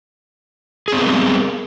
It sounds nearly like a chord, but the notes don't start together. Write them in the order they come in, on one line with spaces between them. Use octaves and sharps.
G#4 C4 B3 A#4 G3